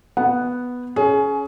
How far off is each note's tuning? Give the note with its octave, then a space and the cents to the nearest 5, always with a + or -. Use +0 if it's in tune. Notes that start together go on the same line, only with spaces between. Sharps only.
B3 +0 F#5 +0
C#4 +10 G#4 +25